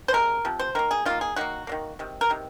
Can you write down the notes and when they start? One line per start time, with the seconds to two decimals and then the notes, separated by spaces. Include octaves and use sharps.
0.08 C5
0.13 C3 F3 G#3 A#4
0.45 C3 F3
0.59 C5
0.75 D#3 A#3 A#4
0.91 G#4
1.05 D#3 A#3 F4
1.21 G#4
1.36 D#3 F#3 A#3 F#4
1.67 D#3 F#3 A#3
1.99 C3 D#3
2.21 A#4
2.30 C3 D#3